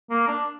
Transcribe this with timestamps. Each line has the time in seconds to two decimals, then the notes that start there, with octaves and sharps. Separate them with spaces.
0.10 A#3
0.27 D4